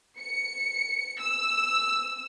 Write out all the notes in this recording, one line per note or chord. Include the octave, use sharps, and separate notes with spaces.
C#7
E6